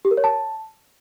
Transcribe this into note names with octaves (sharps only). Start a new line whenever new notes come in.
G4
A#4
C#5
A5